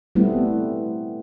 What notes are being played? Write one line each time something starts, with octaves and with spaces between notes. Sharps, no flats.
G3 A3 B3 C4 E4